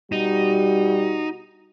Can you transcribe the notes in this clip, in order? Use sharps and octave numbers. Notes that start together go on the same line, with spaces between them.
B2 G3 D#4 F#4